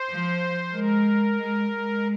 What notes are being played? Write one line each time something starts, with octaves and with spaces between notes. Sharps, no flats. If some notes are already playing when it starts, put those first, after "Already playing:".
Already playing: C5
F3
G#3 A#4
G#3
G#3